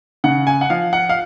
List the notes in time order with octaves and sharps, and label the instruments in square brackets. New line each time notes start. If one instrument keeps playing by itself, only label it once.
[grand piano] C#3 F#5
G#5
F#5
F3 F5
F#5
F5